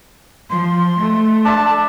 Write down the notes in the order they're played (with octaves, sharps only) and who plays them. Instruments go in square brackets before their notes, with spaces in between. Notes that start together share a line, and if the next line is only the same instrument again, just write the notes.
[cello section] F3 [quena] C6
[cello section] A3
[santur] D4 E5 [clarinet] A5